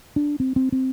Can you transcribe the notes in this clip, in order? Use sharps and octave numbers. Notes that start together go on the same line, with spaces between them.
D4
C4
C4
C4